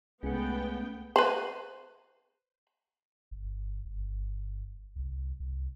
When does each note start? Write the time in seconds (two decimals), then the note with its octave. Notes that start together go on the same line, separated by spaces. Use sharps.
0.23 C2 G#3 A3 B3 C#4 F#5 G5
1.16 B4 C5
3.31 G1
3.85 G1
4.96 C2
5.40 C2